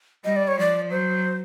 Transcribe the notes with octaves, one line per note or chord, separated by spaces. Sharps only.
G3 D#5
D5
C#5
F3 D5
F#3 C5